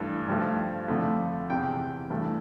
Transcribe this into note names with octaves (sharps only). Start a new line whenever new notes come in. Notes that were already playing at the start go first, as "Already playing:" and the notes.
Already playing: G2 E3 A3
G2 F3 A3
F2 D3 A3
E2 C3 E3 G5
G2 E3 A3